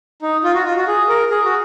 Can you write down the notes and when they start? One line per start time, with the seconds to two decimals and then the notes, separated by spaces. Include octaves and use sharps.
0.22 D#4
0.44 F4
0.55 F#4
0.65 F4
0.77 F#4
0.87 G#4
1.09 A#4
1.30 G#4
1.44 F#4